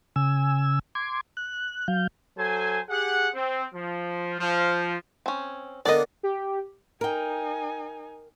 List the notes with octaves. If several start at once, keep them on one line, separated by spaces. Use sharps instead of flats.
C#3 G#5 E6
C6 D6 G#6
F#6
F#3 F5 G6
F#3 A4 C5 G#5
G4 G#4 F#5
C4
F3
F3
C4 C#4
D3 A#3 B3 D5 D#5
G4
D#4 A#4 G5 G#5